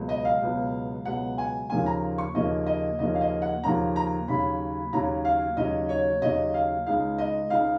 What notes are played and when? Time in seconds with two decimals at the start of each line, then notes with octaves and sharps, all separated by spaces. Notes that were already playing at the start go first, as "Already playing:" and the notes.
Already playing: C#2 B2 F#3
0.09 D#5
0.25 F5
0.42 C#2 B2 F#3
1.05 C#2 B2 F#3 F#5
1.38 G#5
1.70 D#2 C#3 F3 A#3 C#4 G#5
1.86 A#5
2.18 C#6
2.34 D#2 C#3 F3 A#3 C#4 D#5
2.67 D#5
2.99 D#2 C#3 F3 A#3 C#4 D#5
3.15 F5
3.21 D#5
3.42 F#5
3.64 D#2 C#3 F3 A#3 C#4 A#5
3.96 A#5
4.28 D#2 C#3 F#3 C#4 B5
4.93 D#2 C#3 F#3 C#4 A#5
5.25 F5
5.57 D#2 C#3 F#3 C#4 D#5
5.89 C#5
6.22 D#2 C#3 F#3 C#4 D#5
6.54 F5
6.86 C#2 C#3 G#3 D#4 F5
7.18 D#5
7.50 C#2 C#3 G#3 D#4 F5